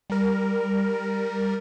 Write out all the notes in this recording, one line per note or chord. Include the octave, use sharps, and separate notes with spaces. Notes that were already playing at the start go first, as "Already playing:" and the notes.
G3 A#4